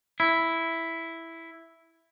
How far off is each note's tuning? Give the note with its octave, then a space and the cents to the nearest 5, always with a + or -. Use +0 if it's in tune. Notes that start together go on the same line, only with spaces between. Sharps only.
E4 +0